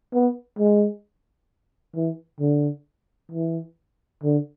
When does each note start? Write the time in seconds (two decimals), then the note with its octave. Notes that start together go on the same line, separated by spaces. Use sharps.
0.13 B3
0.59 G#3
1.95 E3
2.40 D3
3.32 E3
4.23 D3